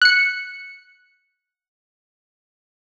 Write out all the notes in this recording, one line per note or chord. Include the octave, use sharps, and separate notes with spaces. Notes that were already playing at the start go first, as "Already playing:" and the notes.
F#6 C#7